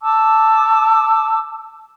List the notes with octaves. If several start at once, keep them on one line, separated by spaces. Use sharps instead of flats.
A5 D6 E6